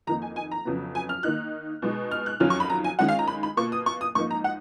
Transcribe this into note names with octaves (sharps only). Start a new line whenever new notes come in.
F2 D#3 A#3 D#4 A#5
G#5
G#5
A#5
F2 C#3 F#3 B3
G#5
F6
D#3 A#3 D#4 F#6
B2 G#3 D#4
F6
F#6
F2 D#3 F#3 C#4 F4 F6
C#6
B5
A#5
G#5
D#3 G#3 C#4 F4 F#5
F5
A#5
B5
B5
B2 A#3 F4 C#6
D#6
C#6
D#6
G#2 F3 A#3 D#4 C#6
A#5
F#5